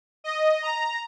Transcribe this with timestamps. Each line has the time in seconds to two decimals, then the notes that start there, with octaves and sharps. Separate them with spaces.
0.24 D#5
0.62 A#5